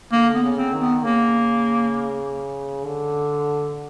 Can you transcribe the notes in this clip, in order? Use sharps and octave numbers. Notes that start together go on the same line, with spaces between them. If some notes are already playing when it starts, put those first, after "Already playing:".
D3 A#3
B3
C#3
C4
D#3
B3
C#3 A#3
D3